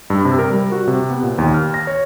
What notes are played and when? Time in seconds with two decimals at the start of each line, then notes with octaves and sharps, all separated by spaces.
0.10 G2
0.25 C3
0.39 A#4
0.50 G3
0.72 F#4
0.87 C3
1.10 B3
1.23 A#2
1.38 D#2
1.54 F6
1.74 A#6
1.87 C#5